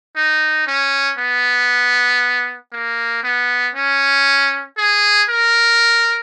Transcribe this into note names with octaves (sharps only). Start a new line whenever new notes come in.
D#4
C#4
B3
A#3
B3
C#4
G#4
A#4